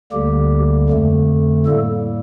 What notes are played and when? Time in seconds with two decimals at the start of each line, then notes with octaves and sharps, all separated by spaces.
0.12 D2 D3 G3 A#3 G4
0.90 F2 D3 A3
1.66 A2 G3 A#3 A4